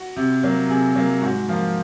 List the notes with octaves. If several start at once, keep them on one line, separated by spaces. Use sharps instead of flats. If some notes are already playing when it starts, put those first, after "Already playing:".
Already playing: F#4
C3
F#3 A#3
C3 G#4
F#3 A#3
G#2 F#4
F3 A#3 F4